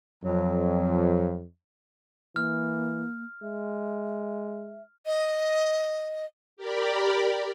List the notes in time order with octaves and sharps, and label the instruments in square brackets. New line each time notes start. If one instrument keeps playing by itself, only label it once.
[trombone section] F2 [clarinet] F#3
[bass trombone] E3 [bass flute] A#3 [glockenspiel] F6
[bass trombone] G#3 [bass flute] E5
[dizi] D#5
[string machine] G4 A#4 D5 B5